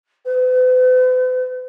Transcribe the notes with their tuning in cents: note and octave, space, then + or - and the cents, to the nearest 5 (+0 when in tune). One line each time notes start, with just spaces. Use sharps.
B4 +45